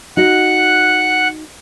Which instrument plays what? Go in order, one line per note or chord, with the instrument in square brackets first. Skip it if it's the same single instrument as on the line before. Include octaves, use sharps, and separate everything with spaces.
[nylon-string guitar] D#4 F#4 D#5 [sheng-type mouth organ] F#5 F#6